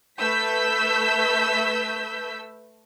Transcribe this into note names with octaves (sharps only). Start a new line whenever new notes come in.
A3 B4 E6 G6 B6